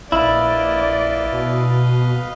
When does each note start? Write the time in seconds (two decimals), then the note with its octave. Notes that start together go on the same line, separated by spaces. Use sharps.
0.12 A#1 E4 B4 D5 D#5 F5
1.32 B2